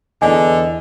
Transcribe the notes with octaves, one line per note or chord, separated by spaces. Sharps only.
E2 D3 D#5 G#5